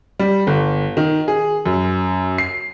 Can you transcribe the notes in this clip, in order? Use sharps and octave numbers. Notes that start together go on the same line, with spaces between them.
G3
G1
D#3
G#4
F#2
C7